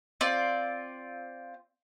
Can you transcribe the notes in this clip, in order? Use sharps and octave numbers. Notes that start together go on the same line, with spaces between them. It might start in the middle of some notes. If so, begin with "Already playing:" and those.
C4 F4 D5